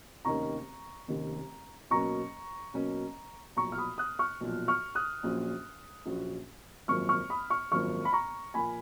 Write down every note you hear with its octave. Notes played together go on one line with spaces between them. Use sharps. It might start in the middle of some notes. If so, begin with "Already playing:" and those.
F1 D#2 D#3 A#3 C#4 A#5 C#6
F1 D#2 D#3 A#3 C#4
B2 F#3 A#3 C#4 A#5 C#6
B2 F#3 A#3 C#4
B1 A#2 F3 A#5 C#6
F6
B5 D#6
D#6 F#6
C#6 F6
B1 A#2 F3
C#6 F6
D#6 F#6
A#1 A#2 F#3 C#4 F#4
A#1 A#2 F#3 C#4 F#4
G#1 F#2 F3 A#3 C#6 F6
C#6 F6
B5 D#6
C#6 F6
G#1 F#2 F3 A#3 C#6 F6
B5
A#5 C#6
A#2 F3 A#3 G#5 B5